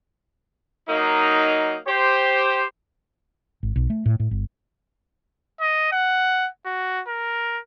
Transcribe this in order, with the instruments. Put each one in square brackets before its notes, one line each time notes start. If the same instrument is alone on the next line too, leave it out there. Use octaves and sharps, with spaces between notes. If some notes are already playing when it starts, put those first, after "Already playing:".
[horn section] F#3 A#3 D#4
G4 C5
[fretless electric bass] G#1
B1
A3
A2
A2
G1
[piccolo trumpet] D#5
F#5
F#4
A#4